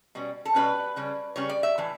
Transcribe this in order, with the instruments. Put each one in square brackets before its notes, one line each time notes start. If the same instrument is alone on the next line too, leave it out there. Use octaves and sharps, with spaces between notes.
[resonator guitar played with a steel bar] B2 G3 C#4
A4
B2 G3 C#4 B4
C#3 G3 C#4
C#3 G3 C#4 C#5
D5
E5
A2 E3